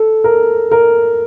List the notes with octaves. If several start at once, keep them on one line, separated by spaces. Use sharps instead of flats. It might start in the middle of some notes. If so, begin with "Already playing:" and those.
Already playing: A4
A#4
A#4